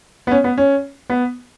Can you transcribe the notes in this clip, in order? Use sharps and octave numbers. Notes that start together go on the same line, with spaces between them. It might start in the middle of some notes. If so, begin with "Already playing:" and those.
B3
C#4
B3
C#4
B3